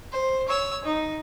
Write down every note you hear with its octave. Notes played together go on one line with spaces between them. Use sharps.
C5
C#5 E6
D#4